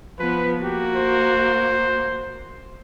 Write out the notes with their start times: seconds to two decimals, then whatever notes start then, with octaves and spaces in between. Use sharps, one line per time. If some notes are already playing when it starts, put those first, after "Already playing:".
0.19 F3 B3 B4
0.63 A#3 F#4 G4
0.95 C5